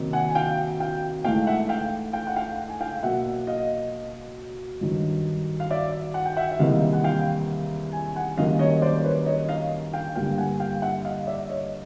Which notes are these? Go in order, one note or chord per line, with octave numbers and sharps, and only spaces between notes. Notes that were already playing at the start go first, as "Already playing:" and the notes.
Already playing: C3 D#3 F#3 A#3
F#5 G#5
G#5
F5 G5
F5 G5
G#2 E3 A3 F5 G5
E5 F#5
F5 G5
F5 G5
F#5
F5 G5
G#5
F5 G5
B2 F#3 A#3 E5 F#5
D#5 F5
G2 D#3 F#3
F5
D5 E5
F#5
G5
E5 F#5
E5
E2 C3 D#3 G3 A#3 D#5 F5
F#5
F5 G5
G#5
F#5 G#5
F#2 D#3 G3 A#3 D#5 F5
C#5 D#5
C5 D5
B4 C#5
C#5 D#5
D#5 F5
F5 G5
G2 D3 G3 A#3 F5 G5
F#5 G#5
F5 G5
E5 F#5
D#5 F5
D5 E5
C#5 D#5